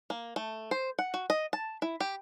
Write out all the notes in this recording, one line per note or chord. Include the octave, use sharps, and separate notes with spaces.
A#3
A3
C5
F#5
F#4
D#5
A5
E4
G4